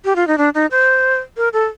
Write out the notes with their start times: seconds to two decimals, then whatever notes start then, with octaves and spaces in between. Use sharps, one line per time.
0.05 G4
0.16 F4
0.27 D#4
0.38 D4
0.55 D#4
0.71 C5
1.37 A#4
1.53 A4